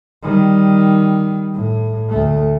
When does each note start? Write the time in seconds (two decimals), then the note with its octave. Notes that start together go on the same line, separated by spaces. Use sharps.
0.23 D#3 G3
1.53 A2
2.09 D2 A3